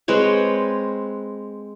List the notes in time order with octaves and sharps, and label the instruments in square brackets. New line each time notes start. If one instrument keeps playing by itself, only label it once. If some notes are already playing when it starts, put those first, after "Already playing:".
[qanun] G#3 C4 B4 C#5